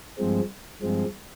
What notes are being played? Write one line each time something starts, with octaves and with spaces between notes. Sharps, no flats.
G2 F3 G#3 C4
G2 F3 G#3 C4